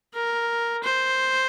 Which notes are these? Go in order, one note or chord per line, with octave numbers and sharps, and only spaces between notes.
A#4
C5